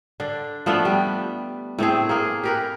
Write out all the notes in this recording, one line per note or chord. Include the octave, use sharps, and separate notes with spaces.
D3 D4
F3 A3 B3 D4
G3
A2 A3 C4 G#4
A#3 G#4
G4 A#4 B4